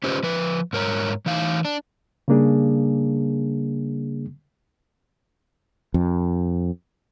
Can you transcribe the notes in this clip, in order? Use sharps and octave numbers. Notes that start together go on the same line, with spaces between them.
C#4 F4 G4 B4 C5
F3 B4
G#2 A#4 C#5 A#5
E3 D#4 F5
D4
C#3 G3 A#3 D4 G#4
F2